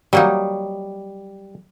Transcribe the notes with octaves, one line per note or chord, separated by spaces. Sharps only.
F#3 G3 A#3 D#4